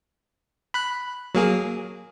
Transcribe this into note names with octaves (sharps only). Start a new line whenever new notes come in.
B5 F#6
F#3 A#3 G#4